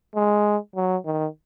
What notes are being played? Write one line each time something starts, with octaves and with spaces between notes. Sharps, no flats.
G#3
F#3
D#3